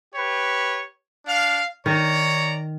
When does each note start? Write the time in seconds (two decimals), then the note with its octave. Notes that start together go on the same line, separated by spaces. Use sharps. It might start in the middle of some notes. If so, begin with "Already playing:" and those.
0.15 G4 B4 C#5
1.26 D4 F5
1.86 D#3 C#5 D5 A#5